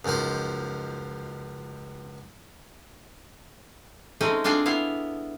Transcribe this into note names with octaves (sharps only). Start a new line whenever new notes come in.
C#2 F#2 F3 D#4 C5
G#3 A3 C4 C#4 D#4 D#5
C4 D4 F4 G#4 A4 G#5
B3 E4 F5